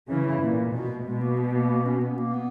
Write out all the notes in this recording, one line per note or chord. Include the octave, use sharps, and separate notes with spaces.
C#3 E3 C#4
E4
A#2
B2
B2 G#3
A#3
B3
A#3
A#3
C#4
B3
A#3
B3